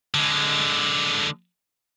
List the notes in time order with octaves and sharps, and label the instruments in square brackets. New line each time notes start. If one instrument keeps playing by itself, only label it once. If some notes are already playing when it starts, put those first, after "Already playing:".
[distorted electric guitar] D3 G#3